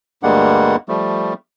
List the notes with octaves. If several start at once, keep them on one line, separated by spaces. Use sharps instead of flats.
D2 G2 G3 G#3 A#3 F#5
F3 G3 A3